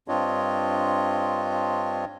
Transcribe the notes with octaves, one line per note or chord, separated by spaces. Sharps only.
G2 C4 D4 F4 C#5 D#5